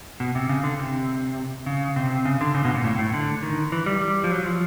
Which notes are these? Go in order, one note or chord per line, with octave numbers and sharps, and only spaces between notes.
B2
C3
C#3
D3
C3
C#3
C3
C#3
D3
C#3
B2
A#2
A2
A2
D3
D#3
E3
G3
G3
F3
F#3
F3